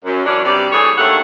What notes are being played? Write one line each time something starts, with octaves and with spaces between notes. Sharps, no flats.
F#2
E3 F#3 C#4 D4
G2 C3 G3 D5
E3 A3 G#4 C#5
D#2 D3 A3 A4 C#5 F#5